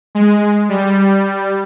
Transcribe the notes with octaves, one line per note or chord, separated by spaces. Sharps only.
G#3
G3